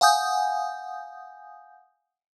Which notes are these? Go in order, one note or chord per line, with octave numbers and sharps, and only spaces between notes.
F5 F#5 G#5 D#6 G6